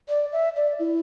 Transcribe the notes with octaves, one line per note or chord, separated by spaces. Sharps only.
D5
E5
D5
E4